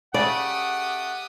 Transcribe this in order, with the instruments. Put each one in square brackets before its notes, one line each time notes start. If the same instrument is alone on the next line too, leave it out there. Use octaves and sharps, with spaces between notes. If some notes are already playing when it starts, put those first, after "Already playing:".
[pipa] C#3 A3 [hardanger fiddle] G4 D#6 [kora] D5 [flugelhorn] F#5